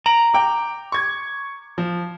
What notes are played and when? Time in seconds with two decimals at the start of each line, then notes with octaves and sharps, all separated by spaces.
0.06 A#5 D7 F#7
0.34 G5 D6
0.92 C#6 G#6
1.78 F3